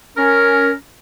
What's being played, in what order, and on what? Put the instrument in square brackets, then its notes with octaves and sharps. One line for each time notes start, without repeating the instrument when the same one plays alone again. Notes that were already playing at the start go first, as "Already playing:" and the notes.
[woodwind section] C#4 A#4